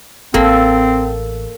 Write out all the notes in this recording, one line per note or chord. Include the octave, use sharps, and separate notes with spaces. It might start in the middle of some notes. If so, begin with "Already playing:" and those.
A1 A#3 C4 A4